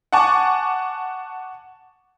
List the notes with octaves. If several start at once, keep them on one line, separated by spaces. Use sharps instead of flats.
F#5 G#5 A5 C#6 D6